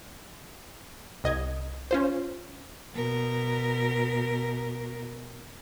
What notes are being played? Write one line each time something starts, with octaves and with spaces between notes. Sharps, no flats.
C2 D#5 G#6
C#4 F4 C5
B2 A#4